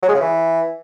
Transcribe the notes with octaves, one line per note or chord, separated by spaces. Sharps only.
F#3
G#3
C#3
E3